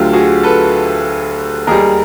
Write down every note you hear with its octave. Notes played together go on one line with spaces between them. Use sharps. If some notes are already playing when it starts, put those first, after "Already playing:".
Already playing: D2 D3 F#3 F4 G4
F#4 G#4
A4 B4
D#2 D#3 G3 G#4 A#4